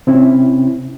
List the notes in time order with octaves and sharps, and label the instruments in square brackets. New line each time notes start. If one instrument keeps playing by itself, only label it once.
[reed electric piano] C3 C4 C#4 E4